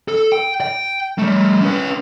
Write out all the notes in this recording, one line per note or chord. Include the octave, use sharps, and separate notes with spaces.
A4
G5
G5
G3 A3
C#4 B4